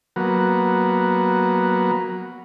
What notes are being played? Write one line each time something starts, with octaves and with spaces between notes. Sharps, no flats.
F#3 A#3 B3